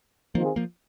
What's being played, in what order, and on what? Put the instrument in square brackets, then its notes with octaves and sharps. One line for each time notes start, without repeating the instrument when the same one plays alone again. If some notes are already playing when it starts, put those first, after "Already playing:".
[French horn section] D#3 C4 F4 G#4 [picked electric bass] F3 A#3
[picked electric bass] F3 A#3